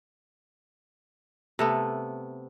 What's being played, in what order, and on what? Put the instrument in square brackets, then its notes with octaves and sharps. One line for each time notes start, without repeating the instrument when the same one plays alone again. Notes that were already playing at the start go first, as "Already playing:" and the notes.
[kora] C3 A3 B3